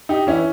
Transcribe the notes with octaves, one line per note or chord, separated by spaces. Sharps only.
D#4 G4
E3 C#4 E4